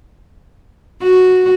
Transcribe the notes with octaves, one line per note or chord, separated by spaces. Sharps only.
F#4